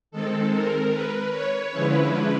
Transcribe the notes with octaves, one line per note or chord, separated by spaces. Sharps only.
D#3 G#3 C4 A4
A#4
B4
C#5
D3 F3 G#3 C#4 E4 B4